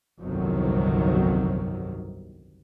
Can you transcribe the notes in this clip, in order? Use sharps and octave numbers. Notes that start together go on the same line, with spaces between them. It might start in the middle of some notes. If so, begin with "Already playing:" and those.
G1 C2 F2 C3 D#3 F#3